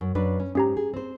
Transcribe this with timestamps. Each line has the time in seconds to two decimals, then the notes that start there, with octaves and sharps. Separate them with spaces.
0.01 F#2
0.15 F#2 D4 B4
0.40 C#4
0.55 G#2 C#4 G4 A#5
0.77 G#4
0.94 C4 C5